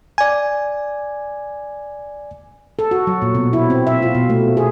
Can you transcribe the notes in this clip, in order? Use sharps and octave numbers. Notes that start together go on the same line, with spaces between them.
D5 G#5
A4
F#4
F#3
A#2
B2
E4
C4
E5
F4
B2
A3
G#4